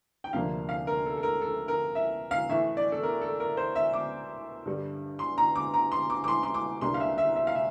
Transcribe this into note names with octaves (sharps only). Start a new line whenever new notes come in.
G5
D2 C3 F3 A#3 D4 F5
F5
A#4
A4
A4
A#4
A4
A#4
E5
F5
A2 E3 A3 E5
D5
A4
A#4
A4
A#4
C5
E5
D6
G2 D3 G3
C6
A#5
D6
A#5
C6
D6
D6
C6
C6
D6
C2 C3 G3 A#3 D4 C6
F5
E5
E5
E5
F5
E5